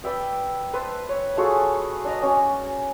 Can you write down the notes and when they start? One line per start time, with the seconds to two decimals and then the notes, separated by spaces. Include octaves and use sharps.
0.04 B4 D5 E5 G5
0.74 B4 C5 A5 E6
1.09 C#5
1.37 A3 F4 F#4 G#4
2.05 D4 D#5 A#5
2.22 C#4 F#4 D5